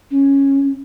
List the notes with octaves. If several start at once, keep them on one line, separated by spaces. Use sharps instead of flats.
C#4